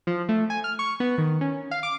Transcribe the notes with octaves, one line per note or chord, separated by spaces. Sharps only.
F3
A3
G#5
F6
C#6
B3
D#3
C#4
F5
D6